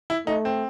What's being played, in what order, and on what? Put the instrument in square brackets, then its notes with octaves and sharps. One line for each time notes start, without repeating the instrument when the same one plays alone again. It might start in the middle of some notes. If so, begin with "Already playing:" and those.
[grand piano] E4
[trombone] A3 [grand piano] D#4
[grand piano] C4